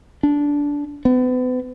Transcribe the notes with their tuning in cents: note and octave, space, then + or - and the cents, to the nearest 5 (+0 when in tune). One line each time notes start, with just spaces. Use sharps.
D4 -15
B3 +35